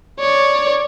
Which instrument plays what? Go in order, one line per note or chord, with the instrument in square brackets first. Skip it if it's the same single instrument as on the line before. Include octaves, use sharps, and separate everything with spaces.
[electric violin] C#5 D5